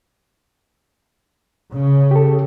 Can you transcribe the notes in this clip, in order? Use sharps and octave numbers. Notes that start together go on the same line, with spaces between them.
C#3
G4 A4